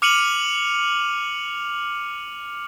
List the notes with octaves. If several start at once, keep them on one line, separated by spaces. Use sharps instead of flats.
D6 F6 C#7 D#7 F7 F#7